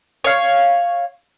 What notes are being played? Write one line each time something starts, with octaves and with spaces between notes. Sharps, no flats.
C#5 F5